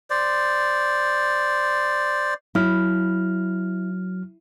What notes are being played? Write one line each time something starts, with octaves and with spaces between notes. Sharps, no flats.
C5 D5
F#3 E4 F6